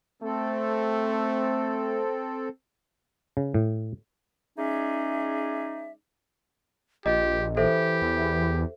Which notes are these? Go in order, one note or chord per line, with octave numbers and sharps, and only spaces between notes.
A3 C4 A4
C#3
A2
G#3 C#4 D#4 G#4 D5 E5
A#1 F4 G4 D#5
E3 G4 A4 C5 E5
E2